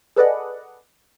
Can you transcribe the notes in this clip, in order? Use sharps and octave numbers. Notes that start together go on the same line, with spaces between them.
G#4 A4 B4 D5 D#5 F#5